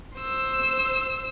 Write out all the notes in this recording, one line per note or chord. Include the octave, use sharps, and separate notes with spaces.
C5 E6